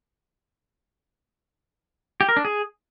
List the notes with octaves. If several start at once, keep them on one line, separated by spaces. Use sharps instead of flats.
G4
A#4
D4
G#4